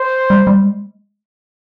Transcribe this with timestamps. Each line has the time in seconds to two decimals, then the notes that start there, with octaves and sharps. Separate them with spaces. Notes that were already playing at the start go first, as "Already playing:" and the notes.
Already playing: C5
0.30 G3
0.47 G3
0.64 G#3